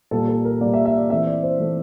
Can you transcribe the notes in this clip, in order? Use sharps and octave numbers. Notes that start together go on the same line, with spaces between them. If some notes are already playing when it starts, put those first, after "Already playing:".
A#2 G3 A#3 A4
A4
A#4
A#2 G3 A#3 D5
E5
E5
D5
E3 A3 C4 E5
D5
C5
E3 A3 C4